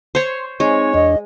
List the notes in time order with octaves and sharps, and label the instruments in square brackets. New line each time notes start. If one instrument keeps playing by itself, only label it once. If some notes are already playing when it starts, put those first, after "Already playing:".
[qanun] C5 C#5 [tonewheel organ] C6
[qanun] G#3 [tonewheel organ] C4 D#4 G#5 [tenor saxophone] C#5
[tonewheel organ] E2 D4 [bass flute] D#5